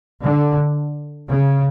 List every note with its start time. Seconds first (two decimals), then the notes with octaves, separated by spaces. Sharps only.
0.22 D3
1.30 C#3